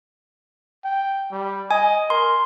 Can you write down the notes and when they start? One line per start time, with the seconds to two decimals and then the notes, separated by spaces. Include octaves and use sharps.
0.84 G5
1.32 G3
1.71 D#5 G#5
2.10 A#4 C6